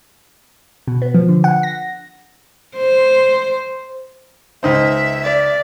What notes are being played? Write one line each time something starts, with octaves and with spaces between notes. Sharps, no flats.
B2
B3
F3
D3
F#5
A#6
C5
C#2 D#4 C5 E5
D5